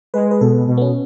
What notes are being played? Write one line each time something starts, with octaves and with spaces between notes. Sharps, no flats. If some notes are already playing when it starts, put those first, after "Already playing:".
G#3 B4
B4
B2 A4
B2
B3
C#4